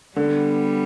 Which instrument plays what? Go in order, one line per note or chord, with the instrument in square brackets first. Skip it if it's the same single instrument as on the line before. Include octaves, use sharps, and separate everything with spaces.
[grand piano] D3 [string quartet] G3 B3